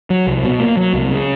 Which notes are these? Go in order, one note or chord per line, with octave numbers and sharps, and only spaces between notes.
F#3
C2
B2
A#3
F#3
C2
C#3